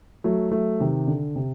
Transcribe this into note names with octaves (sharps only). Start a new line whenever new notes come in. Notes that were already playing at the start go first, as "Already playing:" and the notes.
F#3 A3
F#3 A3
C3 D#3
D3
C3